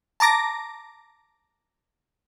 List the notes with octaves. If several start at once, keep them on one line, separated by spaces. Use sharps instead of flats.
A5 A#5 D6 A#6